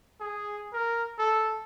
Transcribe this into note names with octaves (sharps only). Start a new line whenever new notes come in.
G#4
A#4
A4